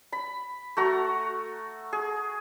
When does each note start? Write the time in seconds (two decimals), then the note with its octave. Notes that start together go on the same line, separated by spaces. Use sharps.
0.12 B5
0.77 A3 F#4 A#5
1.93 G#4